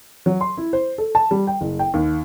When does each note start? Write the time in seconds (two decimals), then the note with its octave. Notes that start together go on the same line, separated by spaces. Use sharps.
0.26 F#3
0.41 C6
0.57 E4
0.73 C5
0.98 A4
1.15 A5
1.31 G3
1.47 G5
1.61 F#1
1.79 G5
1.94 D#2